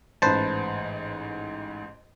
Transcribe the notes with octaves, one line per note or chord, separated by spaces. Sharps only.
A1 G#2 B4 C5 A5